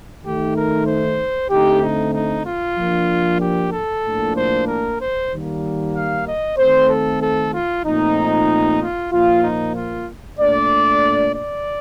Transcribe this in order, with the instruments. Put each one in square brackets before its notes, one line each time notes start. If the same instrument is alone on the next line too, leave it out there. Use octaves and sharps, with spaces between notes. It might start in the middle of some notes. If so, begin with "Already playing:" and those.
[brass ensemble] D#3 A3 D#4 G4
A#4
C5
D3 A3 C4 D#4 G4
D#4
D#4
F4
F3 A#3 D4
G4
A4
A2 F3 A#3 D4
C5
A#4
C5
D#3 G3 A#3
F5
D#5
D#3 A3 C4 C5
A4
A4
F4
A#2 F3 A3 C4 D#4
F4
A#2 F3 A#3 F4
D#4
F4
A#2 A3 D4 D5
D5